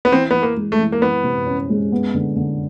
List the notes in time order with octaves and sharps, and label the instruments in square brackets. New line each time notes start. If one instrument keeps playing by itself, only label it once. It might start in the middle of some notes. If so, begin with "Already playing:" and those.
[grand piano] B3
[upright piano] E3 [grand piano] C4
[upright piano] E3 [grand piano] B3
[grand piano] A#3
[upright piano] G#3
[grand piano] A3
[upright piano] E3
[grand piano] A#3
[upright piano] E3 [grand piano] B3
[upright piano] C3
C#4
G#3
B3
D3
D3